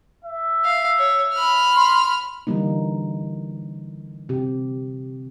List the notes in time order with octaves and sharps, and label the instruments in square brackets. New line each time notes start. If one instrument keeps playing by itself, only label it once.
[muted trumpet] E5
[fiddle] F5
C#5
B5 F6
[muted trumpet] C6
[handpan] D3 E3 G3 A#3 D#4
C3 G4